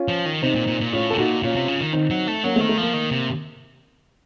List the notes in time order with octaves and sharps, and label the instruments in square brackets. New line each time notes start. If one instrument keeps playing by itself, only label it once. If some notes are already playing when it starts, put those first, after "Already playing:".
Already playing: [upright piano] C#4 F4
[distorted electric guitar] F3
D#3
[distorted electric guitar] C3 [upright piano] C4 D#4
[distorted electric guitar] A#2
A#2
A#2
[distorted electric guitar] A2 [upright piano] C#4 F4
[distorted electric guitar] C3 [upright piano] A4
[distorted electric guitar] A#2 [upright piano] D#4 F#4
[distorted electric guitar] A#2 [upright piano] C#4 F4
[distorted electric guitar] C3
C#3
D#3
[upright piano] C4 D#4
[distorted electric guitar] F#3
A3
[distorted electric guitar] F#3 [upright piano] A#3 C#4
[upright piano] A3 C4
[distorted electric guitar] D#3
[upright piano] A3
[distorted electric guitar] F3 [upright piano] A#3
[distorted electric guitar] D#3
C3